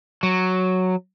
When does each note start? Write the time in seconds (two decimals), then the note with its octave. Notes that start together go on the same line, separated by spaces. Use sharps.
0.23 F#3